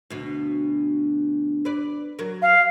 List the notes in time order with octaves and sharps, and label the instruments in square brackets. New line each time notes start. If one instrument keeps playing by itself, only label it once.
[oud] D2 B2
B4 D5
F#3 A#4
[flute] F5